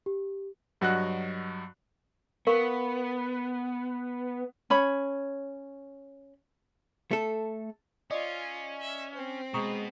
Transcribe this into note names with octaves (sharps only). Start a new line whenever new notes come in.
G4
G2 F#3 F#4 D#5 F#5 F#6
B3 A#4 F5 C#6
C#4 C#5 B5
A3 A4
C#4 F4 D5 D#5
E5
C4
B2 G#3 B3 A#5 C#6 D#6